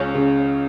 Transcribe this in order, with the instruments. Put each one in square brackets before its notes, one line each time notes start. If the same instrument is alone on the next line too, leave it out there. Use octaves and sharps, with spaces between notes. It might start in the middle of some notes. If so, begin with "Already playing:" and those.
Already playing: [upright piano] C#2 [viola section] C#4
[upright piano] C#3